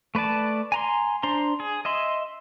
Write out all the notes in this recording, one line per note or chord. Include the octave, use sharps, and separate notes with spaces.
A3 B4 D5 A5
G#5 A#5 C6
D4 C5 A#5 C6
G#4
D#5 E5 C6